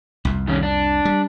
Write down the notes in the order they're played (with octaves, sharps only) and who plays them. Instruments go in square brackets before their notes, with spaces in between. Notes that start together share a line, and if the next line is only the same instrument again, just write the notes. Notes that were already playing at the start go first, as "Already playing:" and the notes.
[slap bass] C2 F2
[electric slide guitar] D#3 C#4
D4
[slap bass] G3